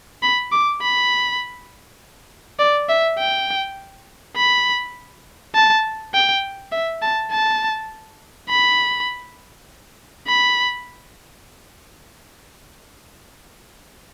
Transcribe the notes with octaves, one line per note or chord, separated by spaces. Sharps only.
B5
D6
B5
D5
E5
G5
B5
A5
G5
E5
A5
A5
B5
B5